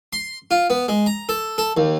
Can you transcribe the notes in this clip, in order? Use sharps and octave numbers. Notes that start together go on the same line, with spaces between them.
C6
F4
B3
G#3
A#5
A4
A4
D#2